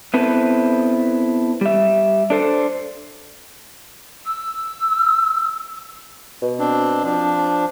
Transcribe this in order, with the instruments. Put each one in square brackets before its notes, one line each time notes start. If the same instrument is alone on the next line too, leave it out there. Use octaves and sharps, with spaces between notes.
[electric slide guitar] B3 C4 E4 A4 B4
G3 E5
D4 A4 C5
[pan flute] E6
[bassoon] B2
[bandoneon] C4 D4
[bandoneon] F3 D4 [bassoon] C4